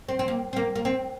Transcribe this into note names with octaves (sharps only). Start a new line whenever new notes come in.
C4
C4
A#3
C4
A#3
A#3
C4